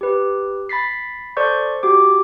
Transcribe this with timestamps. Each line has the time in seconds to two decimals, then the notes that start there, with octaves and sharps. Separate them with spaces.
0.01 G4 B4
0.69 B5 A6 B6 C7
1.37 A4 C5 D5 C#6 G6
1.83 F#4 G4 D6